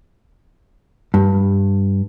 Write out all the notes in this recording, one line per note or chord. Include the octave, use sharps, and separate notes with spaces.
G2